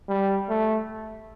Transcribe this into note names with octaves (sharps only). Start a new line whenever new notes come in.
G3
A3